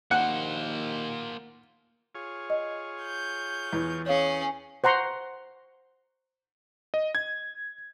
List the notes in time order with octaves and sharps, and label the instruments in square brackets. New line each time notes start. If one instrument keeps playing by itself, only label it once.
[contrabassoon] D#2 [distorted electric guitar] A#3 C5 [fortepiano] F#5
[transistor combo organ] F4 G#4 C#5
[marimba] D#5
[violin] G6
[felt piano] E2
[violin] C#4 G#4 [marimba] C#5 F5
[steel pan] C5 F#5 A#5 C6 C#6
[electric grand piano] D#5
G#6